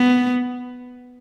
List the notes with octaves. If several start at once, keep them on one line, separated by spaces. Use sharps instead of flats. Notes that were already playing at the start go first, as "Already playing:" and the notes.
Already playing: B3